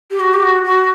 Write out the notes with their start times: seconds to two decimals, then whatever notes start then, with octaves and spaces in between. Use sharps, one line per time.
0.11 G4
0.20 F#4
0.34 G4
0.42 F#4
0.63 F#4